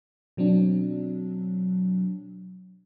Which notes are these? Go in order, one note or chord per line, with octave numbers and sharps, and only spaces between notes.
B2 F#3 C4 D4